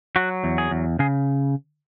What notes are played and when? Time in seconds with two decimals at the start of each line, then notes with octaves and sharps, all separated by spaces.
0.16 F#3 F#4
0.44 E2
0.58 G#4
0.71 E2
0.99 C#3 G#4